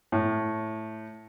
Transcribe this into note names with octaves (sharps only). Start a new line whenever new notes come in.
A2